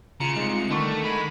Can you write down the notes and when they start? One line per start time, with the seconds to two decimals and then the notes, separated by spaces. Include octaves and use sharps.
0.20 C#3 F4 A#5 C#7
0.36 C2 G#3 D#4 F4
0.70 D3 D#3 A3 C#6
1.04 G#3 B5